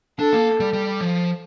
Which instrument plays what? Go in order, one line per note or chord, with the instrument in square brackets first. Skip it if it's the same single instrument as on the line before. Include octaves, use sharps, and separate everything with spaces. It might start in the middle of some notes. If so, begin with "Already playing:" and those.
[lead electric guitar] D4 [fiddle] A4
[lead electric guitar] A#3
G3
G3
F3